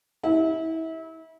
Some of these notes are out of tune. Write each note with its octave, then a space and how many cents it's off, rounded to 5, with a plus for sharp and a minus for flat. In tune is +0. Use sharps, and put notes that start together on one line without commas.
E4 -30